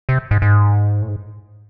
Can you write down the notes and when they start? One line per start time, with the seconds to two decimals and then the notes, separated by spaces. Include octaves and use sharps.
0.09 C3
0.31 G#2
0.42 G#2
1.02 A2
1.08 G#2